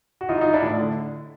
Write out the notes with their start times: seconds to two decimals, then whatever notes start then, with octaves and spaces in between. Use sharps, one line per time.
0.21 F#4
0.29 E3 D#4 F4
0.41 E3 D#4 F4
0.53 D4 E4
0.62 A2
0.79 D3